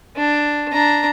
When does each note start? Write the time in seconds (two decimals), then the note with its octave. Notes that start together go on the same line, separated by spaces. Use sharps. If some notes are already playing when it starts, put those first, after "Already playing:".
0.16 D4
0.72 D4 A#5